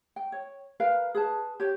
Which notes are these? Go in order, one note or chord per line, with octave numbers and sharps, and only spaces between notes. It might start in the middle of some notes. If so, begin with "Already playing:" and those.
G5
C#5
A#4 B4 F5
G#4 B4 A5
G4 C#5